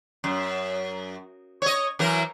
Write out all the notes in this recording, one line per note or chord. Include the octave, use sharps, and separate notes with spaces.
F#2
C#5 D#5
E3 F#3 A#4